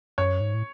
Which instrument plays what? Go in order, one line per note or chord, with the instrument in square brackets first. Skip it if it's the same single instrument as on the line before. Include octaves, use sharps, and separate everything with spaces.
[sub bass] F#2 [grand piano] C#5
[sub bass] G#2
A2